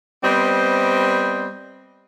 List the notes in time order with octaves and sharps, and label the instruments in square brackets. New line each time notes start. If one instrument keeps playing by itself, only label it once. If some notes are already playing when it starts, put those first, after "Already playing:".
[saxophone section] G3 B3 C4 C5 D5 D#5